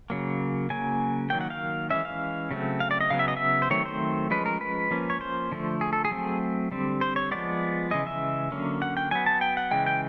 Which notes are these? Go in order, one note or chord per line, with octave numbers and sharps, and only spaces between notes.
C#3 F#3 A#3
C#3 F#3 A#3 G#5
D#3 F#3 A#3 G5
F#5
F5
E3 G#3 C#4 E5
F5
C#3 F#3 A3 C4
F5
D5
D#5
C#3 F#3 B3 F5
E5
D#5
E5
C5
D#3 F#3 A3 C4 C#5
C5
F3 G#3 C#4 B4
A#4
B4
F3 A#3 C#4
C#5
C5
D3 F3 A3
G#4
A4
G#4
F#3 A3 C4
D3 G3 C4
C5
C#5
F3 G#3 B3 D5
C#3 E3 G#3 D#5
E5
D3 F#3 A#3 C#4
F#5
G5
F#3 B3 G#5
A5
G5
F#5
C#3 E3 G#3 G5
G5